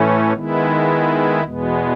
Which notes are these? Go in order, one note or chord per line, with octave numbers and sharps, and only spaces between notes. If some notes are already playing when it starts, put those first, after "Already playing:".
Already playing: A2 E3 A3 C#4
D#3 G#3 B3 E4
E2 B2 G#3 B3